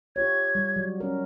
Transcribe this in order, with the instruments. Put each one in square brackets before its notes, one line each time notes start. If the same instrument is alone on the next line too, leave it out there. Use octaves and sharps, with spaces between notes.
[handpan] F4 G4 C#5 [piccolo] G#6
[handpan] G3
F#3
C#4 A#4